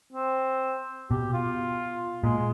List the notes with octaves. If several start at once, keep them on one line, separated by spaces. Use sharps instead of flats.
C4
B2 G4
F4
A#2 G#3